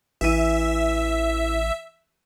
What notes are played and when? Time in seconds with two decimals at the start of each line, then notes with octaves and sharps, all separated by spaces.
0.21 A1 E3 E5 D#7